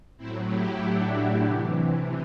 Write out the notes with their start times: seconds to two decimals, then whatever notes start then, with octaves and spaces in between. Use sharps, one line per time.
0.18 A2 F#3 C4 E4
0.49 E4 G4
0.80 D4 F#4
1.12 E4 G4
1.44 C3 E3